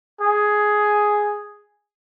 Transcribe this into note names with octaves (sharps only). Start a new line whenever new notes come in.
G#4